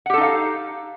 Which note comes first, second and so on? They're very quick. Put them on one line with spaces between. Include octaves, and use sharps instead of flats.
F#5 G4 A4 D#4 F5